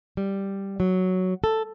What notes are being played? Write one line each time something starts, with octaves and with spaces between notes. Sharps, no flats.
G3
F#3
A4